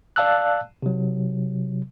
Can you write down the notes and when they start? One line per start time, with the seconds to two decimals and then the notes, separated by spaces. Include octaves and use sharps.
0.16 D5 F5 A5 E6 F#6
0.82 C3 F#3